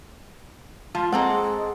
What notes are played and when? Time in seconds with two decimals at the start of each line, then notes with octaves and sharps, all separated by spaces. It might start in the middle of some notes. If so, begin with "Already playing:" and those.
0.95 F3 G#3 F4
1.12 G#3 A#3 C4 G#4 A4 F#5